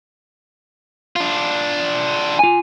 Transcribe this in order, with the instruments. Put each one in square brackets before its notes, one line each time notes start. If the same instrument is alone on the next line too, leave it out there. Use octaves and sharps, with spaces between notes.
[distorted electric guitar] D4 F4
[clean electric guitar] F4 G#5